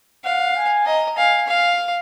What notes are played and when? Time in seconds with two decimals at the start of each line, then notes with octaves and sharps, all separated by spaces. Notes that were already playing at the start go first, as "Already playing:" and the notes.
0.24 F5 F#5
0.56 G#5
0.86 D#5 A#5
1.17 F5 G#5
1.48 F5